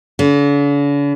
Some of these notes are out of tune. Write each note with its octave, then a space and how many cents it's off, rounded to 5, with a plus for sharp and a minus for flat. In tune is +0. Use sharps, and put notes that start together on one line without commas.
D3 -45